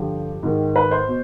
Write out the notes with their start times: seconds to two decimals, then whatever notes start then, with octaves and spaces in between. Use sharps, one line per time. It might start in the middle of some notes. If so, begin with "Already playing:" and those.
Already playing: G2 D3 F3 G4
0.43 G#2 D#3
0.76 B4
0.91 C5
1.08 B2